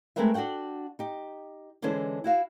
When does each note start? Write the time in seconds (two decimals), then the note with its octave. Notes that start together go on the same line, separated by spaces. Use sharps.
0.16 G#3 A3 C4 A#4 B4 E5
0.34 D4 F#4 A4 F#5 G5
0.99 D#4 G4
1.82 D3 E3 G#3 C#4 A4 C5
2.24 E4 F#4 F5